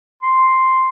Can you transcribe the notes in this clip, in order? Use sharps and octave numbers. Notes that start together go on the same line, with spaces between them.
C6